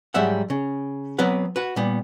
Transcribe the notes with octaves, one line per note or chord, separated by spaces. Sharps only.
G#2 F#3 G3 E5 F#5
C#3
F#3 B3 C4 B4 F#5
F#4 B4
A#2 G3 B3